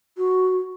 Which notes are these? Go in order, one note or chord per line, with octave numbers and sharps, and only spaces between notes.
F#4